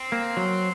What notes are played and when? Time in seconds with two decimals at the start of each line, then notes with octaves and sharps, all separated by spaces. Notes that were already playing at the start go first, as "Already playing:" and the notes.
Already playing: C4
0.12 A#3
0.37 F#3